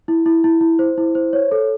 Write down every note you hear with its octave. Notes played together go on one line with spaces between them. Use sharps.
E4
E4
E4
E4
C5
E4
C5
C#5
A4